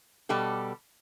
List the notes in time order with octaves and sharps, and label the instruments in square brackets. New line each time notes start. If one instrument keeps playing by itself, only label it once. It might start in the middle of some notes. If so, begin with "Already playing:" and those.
[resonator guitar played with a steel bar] B2 G3 G4 A4